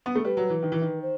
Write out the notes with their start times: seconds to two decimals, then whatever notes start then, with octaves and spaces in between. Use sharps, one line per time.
0.06 B3
0.15 A3
0.24 G3 B4
0.37 F#3
0.50 E3
0.63 D#3
0.72 E3
0.81 D#3
1.01 C5